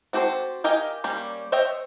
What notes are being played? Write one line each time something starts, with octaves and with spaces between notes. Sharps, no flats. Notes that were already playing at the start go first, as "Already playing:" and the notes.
C4 F#4 G4 A4 C5
G4 A#4 D#5 F5 G#5
G3 A#3 C#4 G4 D5
C5 C#5 D#5 E5 G5